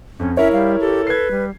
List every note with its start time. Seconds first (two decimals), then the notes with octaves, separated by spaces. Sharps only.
0.20 F2 C#4
0.37 C#4 E4 A#4 C#5 E5
0.52 G3 F5
0.80 G4 A4
1.07 B4 G#6 C7
1.31 G3